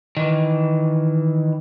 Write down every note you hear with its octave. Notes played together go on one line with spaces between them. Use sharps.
D#3 E3